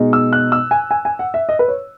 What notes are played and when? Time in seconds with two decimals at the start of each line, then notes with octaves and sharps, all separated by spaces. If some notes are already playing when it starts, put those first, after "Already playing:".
Already playing: B2 G#3 D#4
0.13 E6
0.33 F#6
0.52 E6
0.71 G#5
0.91 G#5
1.05 G#5
1.19 F#5
1.34 E5
1.49 D#5
1.59 B4
1.68 C#5